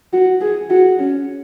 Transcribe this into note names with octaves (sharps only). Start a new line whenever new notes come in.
F#4
G#4
F#4
C#4